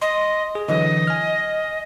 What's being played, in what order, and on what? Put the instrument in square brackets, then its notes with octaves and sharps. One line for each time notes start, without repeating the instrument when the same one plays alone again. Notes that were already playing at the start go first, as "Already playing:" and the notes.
[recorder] D#5 [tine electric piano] C6
[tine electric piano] G#4
[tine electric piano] D3 E3 F#3 [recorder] D#5
[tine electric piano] G#5 F6